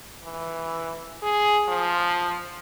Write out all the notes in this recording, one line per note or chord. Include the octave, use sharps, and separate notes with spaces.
E3
G#4
F3